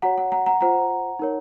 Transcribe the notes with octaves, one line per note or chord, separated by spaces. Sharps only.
F#4 C#5 F#5 A#5
F#5
F#5 A#5
F#5 A#5
F4 C5 F#5 A#5
D#4 A#4 C#5